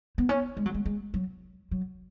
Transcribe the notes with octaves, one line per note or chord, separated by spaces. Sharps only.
B3
C#4
G#3
F#3
G#3
G#3
F#3
F#3